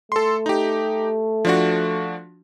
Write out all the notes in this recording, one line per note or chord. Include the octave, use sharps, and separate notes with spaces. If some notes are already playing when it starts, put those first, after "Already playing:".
A3 A4 C6
D#4 G4
F3 D4 F#4